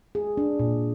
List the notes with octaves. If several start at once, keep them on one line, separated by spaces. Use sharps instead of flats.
G#4
D4
A#2